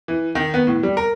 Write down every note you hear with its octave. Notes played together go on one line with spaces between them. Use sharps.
E3
D#3
B3
A2
G3
A#4